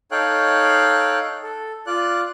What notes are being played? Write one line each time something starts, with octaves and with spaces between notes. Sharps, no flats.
D#4 A4 C#5 F5 G5 F#6
A4
F4 D5 F#6